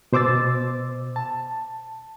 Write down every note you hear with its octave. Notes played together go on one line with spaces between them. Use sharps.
B2 C5 D6 E6 A6
A5